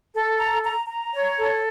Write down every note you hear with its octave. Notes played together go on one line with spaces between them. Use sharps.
A4
A#5
A#5
A#5
C#5
A4